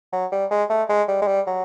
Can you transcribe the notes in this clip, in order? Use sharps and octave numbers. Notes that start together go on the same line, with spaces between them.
F#3
G3
G#3
A3
G#3
G3
G#3
G3
F#3